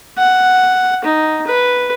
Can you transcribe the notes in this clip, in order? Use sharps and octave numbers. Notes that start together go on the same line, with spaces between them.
F#5
D#4
B4